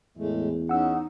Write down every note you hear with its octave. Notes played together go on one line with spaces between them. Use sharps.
E2 A2 G#3 A3
C#4 D#4 F#5 E6